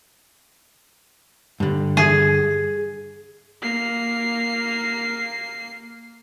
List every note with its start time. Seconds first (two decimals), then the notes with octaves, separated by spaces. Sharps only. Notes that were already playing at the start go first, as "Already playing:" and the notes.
1.60 G2 D3
1.97 G#4
3.62 A#3 C7